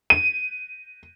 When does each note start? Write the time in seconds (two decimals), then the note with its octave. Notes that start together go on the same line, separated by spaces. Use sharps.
0.10 D#7